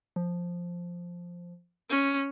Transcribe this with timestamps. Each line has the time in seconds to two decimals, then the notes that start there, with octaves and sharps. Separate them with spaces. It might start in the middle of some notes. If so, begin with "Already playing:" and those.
0.16 F3
1.89 C#4